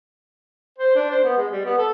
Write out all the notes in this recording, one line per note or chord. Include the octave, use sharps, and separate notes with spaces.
C5
D4
C5
B3
G#3
G3
B3
A4